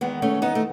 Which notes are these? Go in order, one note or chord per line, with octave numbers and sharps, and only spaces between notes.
E2 D#3 G#3 B3
A3 C#4
B3 D#4
A3